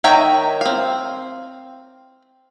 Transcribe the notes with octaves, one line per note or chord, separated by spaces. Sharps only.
D#3 C#5 E5 G5 A#5
C4 F5